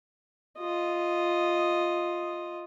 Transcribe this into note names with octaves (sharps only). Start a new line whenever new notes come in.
F4 D#5